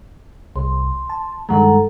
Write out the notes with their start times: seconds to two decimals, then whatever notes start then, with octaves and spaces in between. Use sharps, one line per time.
0.56 C2 C6
1.10 A5
1.49 G2 D#3 G#3 A4 F#5 A#5